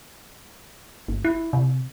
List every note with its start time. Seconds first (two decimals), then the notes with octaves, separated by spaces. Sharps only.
1.08 G1
1.25 E4
1.53 C3